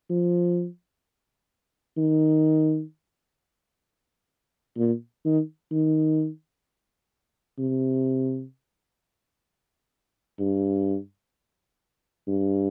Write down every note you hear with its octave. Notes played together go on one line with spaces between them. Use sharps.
F3
D#3
A#2
D#3
D#3
C3
G2
G2